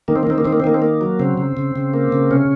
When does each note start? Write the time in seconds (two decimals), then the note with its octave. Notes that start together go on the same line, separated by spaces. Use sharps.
0.08 D#3 A#3
0.16 C4
0.23 A#3
0.27 D#3 C4
0.38 A#3
0.45 D#3 C4
0.53 A#3
0.60 C4
0.64 D#3 A#3
0.74 C4
0.82 A#3
1.01 F#3
1.19 C#3 C4
1.38 C#3
1.57 C#3
1.76 C#3
1.94 A#3
2.12 C#3
2.31 C3 C#4